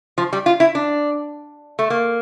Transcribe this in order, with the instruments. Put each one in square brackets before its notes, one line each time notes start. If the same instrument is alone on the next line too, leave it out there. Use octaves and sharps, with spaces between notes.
[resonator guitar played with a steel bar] F3
G3
F4
E4
D4
A3
A#3